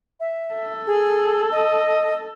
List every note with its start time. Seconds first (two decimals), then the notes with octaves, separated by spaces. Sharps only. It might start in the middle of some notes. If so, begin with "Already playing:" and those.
0.20 E5
0.55 A4
0.87 G#4
1.51 D#5